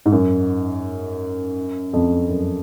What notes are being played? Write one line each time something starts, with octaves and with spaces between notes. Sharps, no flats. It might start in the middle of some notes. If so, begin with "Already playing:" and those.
G#2
F#2
F2
F#2